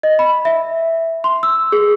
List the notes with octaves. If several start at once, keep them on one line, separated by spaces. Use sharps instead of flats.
D#5
B5
E5
C6
E6
G#4